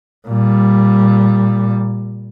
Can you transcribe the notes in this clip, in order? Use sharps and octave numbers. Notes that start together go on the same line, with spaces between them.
A#2 G3